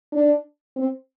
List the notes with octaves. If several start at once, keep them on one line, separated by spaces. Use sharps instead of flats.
D4
C4